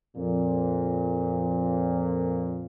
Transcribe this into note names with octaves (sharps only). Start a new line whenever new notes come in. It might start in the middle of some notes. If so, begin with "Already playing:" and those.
F2 A#2